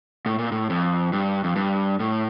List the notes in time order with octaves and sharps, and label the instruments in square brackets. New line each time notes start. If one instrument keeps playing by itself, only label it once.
[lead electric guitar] A2
A#2
A2
F2
G2
F2
G2
A2